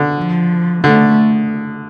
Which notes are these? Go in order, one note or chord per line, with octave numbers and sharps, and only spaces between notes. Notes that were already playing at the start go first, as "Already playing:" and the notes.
Already playing: D3
F3
D3 A3